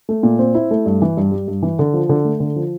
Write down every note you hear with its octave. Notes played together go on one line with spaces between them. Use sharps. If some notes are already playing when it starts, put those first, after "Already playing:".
A3
A#2
C4
E4
A3
G2
E3
G2
G3
G2
E3
D3
F3
D3
A3
D3
F3